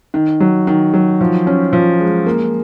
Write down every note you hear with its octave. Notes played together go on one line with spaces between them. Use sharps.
D#3
F#3
D#3
F#3
F3
C#4
F3
G#3
A#3